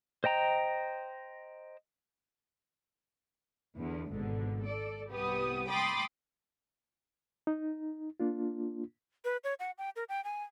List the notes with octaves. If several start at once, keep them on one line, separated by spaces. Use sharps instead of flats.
C5 D#5 G5 A#5
E2 D3
G#1 G#2 B2 D3
A4 D5
C2 B3 G4 D#6
G5 B5 C6 D6 D#6 A6
D#4
A#3 D4 F4
B4
C#5
F#5
G5
A#4
G5
G#5